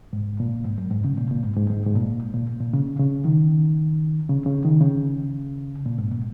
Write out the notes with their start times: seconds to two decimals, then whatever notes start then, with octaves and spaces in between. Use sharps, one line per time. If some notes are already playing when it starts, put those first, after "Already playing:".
0.13 G#2
0.40 A#2
0.65 G#2
0.78 F#2
0.91 G#2
1.05 C#3
1.18 A#2
1.30 A#2
1.44 G#2
1.56 G#2
1.70 G#2
1.86 G#2
1.95 A#2
2.34 A#2
2.61 A#2
2.73 C#3
2.99 C#3
3.25 D#3
4.29 C#3
4.46 C#3
4.65 D#3
4.81 C#3
5.86 A#2
5.99 G#2
6.12 A#2